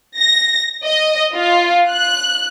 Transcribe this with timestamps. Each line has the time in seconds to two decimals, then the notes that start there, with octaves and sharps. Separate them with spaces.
0.18 A#6
0.84 D#5
1.35 F4
1.90 F#6